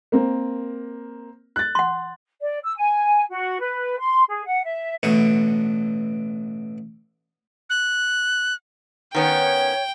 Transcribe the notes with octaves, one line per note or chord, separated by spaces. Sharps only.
A#3 C4 A#4
F#6 A6
F#5 C6
D5
E6
G#5
F#4
B4
C6
G#4
F#5
E5
A1 B2 D3 C#6
F#6
D#3 B3 C#4 C#5 G5